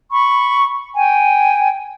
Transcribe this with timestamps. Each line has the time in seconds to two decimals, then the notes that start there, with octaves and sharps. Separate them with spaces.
0.11 B5 C#6
0.96 G5 G#5